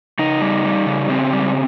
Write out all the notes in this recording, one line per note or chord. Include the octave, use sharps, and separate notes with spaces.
C#3 D#4
G3
G3
C#3
C#3 C4
G3